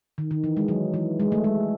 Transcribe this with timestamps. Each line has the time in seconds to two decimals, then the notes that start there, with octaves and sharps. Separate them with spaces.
0.18 D#3
0.31 D#3
0.44 E3
0.57 G#3
0.68 F#3
0.94 E3
1.20 G#3
1.32 A3
1.44 G#3